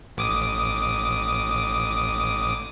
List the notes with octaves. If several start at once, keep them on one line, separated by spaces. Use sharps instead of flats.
A1 D6 D#6